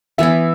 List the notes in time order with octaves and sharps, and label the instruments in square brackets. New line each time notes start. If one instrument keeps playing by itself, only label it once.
[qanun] E3 B3 E4 [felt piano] E5